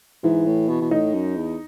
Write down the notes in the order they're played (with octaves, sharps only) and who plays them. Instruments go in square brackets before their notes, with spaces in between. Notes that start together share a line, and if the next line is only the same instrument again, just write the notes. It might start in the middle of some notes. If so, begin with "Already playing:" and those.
[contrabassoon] G#2 [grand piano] E3
[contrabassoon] A2
B2
B2
[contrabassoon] A2 [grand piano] D#4
[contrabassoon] F#2
E2